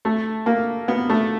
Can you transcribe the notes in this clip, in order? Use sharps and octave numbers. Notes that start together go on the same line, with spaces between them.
A3
A#3
B3
A3